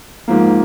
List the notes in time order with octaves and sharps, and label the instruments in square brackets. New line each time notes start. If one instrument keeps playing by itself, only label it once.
[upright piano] G#2 F3 A#3